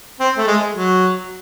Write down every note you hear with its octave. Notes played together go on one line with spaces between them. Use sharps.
C4
A3
G#3
F#3